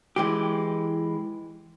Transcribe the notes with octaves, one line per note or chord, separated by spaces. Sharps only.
E3 G#3 G4